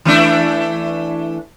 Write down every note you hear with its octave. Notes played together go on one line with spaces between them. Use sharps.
E3 A3 D4